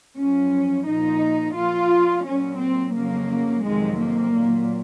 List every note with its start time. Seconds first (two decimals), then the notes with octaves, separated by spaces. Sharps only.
0.18 F#2 F3 C#4
0.87 A#2 F3 D#4
1.56 A#2 F3 F4
2.25 A#2 F#3 C#4
2.61 C4
2.96 F2 C#3 F#3 A#3
3.65 F2 C3 D#3 F#3 G#3
3.99 A#3
4.33 A#2 F#3